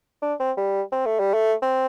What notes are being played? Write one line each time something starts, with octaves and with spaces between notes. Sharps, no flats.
D4
C4
G3
C4
A3
G3
A3
C4